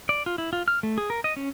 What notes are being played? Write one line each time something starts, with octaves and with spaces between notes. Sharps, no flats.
D5
F4
E4
F4
F6
A3
G#4
A#4
D#5
C#4